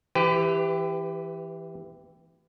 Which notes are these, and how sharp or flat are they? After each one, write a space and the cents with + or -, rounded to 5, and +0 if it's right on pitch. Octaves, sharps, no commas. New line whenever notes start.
E3 +0 G4 +10 B4 +35